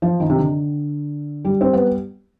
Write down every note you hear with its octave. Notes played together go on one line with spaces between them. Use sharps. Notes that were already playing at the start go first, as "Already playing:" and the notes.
F3
D#3
C3
D3
G3
C4
B3